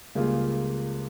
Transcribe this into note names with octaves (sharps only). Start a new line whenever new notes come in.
C#2 C#3 G3 A#3 F4